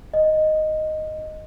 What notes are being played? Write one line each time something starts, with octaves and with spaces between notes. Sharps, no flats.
D#5